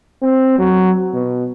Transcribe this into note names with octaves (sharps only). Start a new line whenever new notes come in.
C4
F#3
B2